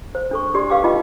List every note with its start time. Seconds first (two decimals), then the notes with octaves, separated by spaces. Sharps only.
0.15 C5
0.31 D4 A4 C#6
0.54 D4 G4 D5 C6
0.69 G4 B4 F5 G5 D6
0.84 D#4 F4 D#5 G5